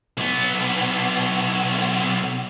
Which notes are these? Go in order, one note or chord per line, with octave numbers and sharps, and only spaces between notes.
B1 B3